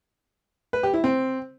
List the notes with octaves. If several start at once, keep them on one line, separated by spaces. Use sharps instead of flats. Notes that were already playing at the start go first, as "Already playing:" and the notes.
B4
G4
E4
C4